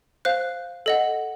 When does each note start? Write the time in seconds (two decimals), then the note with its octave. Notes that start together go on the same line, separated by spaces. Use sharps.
0.25 C5 F5 F#6
0.86 A4 D#5 F#5